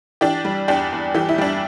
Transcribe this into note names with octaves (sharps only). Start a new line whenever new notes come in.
E3 D4 G4
G3
E2 D4 G4
E2
E3 G4
E4
G3 D4